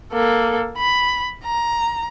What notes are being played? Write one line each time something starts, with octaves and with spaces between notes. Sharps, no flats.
A#3 A4
B5
A#5